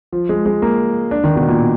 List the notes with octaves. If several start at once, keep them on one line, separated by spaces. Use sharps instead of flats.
F3
G#3
G#3
A#3
D4
D#3
B2
A#2